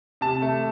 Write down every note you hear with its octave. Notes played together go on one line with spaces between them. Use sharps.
C3 A5
A3